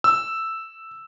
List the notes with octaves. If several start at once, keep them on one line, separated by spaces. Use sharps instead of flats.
E6